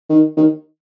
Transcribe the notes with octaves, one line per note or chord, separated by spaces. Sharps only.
D#3
D#3